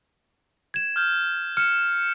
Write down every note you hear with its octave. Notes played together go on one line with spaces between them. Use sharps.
G#6 E7
F6 G6
F6 C#7 E7